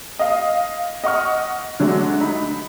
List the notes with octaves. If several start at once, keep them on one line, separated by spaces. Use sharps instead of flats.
D#5 F5
D#5 F#5 C#6 F6
D3 F#3 G#3 A3 D4
D#4 B5